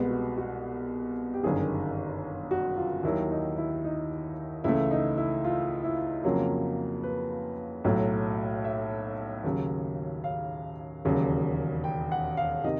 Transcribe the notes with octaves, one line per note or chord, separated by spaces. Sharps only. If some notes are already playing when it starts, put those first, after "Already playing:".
Already playing: C2 B2 G#3 B3
F#4
F#4
G4
G1 F#2 D#3 G#4
F#4
F4
D#2 D#3 F#3 E4
D#4
E4
D#4
C#2 C#3 E3 A3 E4
D#4
E4
F4
E4
F2 C#3 F#3 A#3 F4
B4
B1 A2 F#3 A3
E5
D#2 C#3 F#3
F5
E1 D#2 C#3 F#3
G5
F#5
F5
C3 D#3 D#5